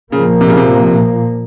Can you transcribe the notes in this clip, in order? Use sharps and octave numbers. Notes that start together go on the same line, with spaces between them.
A#2 C#3 F3 A#3
C3
C#3
C3